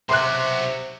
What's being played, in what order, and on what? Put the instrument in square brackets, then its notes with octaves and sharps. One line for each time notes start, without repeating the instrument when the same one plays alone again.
[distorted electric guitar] B1 F#4 [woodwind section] C3 [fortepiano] C6 F#6